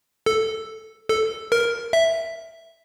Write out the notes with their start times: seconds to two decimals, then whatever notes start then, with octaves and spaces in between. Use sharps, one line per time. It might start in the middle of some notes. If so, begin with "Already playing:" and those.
0.26 A4
1.09 A4
1.52 A#4
1.93 E5